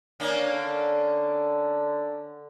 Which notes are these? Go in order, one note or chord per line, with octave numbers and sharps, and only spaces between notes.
A#3 C#4 D4
D3